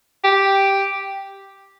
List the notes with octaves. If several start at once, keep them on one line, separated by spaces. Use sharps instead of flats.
G4